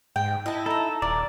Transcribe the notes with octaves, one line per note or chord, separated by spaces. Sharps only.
G#2 G5
E4 D#5 A5
D#4 A4 A#5
D#1 A#4 D5